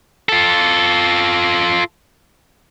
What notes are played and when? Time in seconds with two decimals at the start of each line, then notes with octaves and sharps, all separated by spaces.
0.29 F4 A4